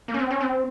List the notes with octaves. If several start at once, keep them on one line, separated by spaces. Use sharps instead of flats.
A#3
C#4
C4
C#4
C4